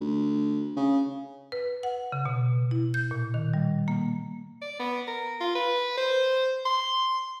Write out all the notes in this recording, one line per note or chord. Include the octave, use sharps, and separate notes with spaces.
D2
C#3
B4
F#5
C#3
B2
E4
G6
A#2
D#3
G3
A#3
D5
B3
A#4
F4
B4
C5
C6